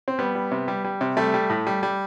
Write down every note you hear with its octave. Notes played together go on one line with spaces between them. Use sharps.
C4
G3 B3
G3
C3
G3
G3
C3
G3 A3
G3
A2
G3
G3